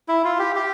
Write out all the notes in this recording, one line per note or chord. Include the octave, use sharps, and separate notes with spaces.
E4
F4
G4
G4